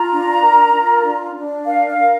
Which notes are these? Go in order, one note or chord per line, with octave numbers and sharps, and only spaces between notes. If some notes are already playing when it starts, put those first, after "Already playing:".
Already playing: F4 A#5
D4
A#4
F4
D4
D4
A#4 F5
F5
A#4